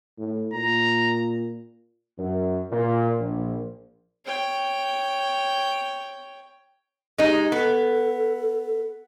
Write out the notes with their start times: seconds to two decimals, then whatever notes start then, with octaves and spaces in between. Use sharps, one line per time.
0.18 A2
0.53 A#2 A#5
2.18 F#2
2.71 A#2
3.20 A#1
4.25 C#5 G5
7.18 G#3 D#4 G4
7.52 B3 A4